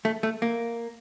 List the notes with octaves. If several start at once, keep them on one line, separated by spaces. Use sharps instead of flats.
A3
A3
A#3